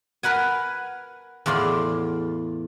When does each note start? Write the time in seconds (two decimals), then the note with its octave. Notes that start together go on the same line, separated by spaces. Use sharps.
0.23 A#4 B4 F#5 G#5
1.46 E2 A2 F4 D5 C6